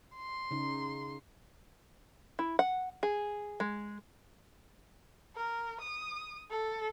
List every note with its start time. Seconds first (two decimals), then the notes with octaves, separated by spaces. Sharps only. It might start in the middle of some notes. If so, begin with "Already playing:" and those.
0.17 C6
0.51 C#3 D#4
2.39 E4
2.59 F#5
3.03 G#4
3.60 G#3
5.36 A#4
5.81 D#6
6.51 A4